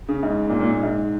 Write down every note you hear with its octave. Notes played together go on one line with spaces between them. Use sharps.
C#3
G#2
A#2
A#2
A#2
G#2